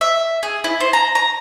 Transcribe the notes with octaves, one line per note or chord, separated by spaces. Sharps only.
E5
G#4
E4
C5
A#5
A#5